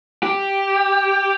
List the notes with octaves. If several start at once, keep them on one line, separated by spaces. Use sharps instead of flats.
G4